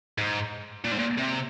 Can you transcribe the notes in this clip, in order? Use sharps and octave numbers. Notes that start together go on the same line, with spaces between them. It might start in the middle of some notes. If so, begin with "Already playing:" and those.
G#2
A#2
G#2
A#2
C3